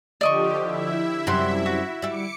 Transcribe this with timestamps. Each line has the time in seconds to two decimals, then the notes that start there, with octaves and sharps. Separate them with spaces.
0.21 D3 F3 G4 D5 D#5 C#6
0.62 E4 E5
1.27 F#2 C3 G3 F#5 C6
1.66 F#4
2.02 G3 E5 D6 C#7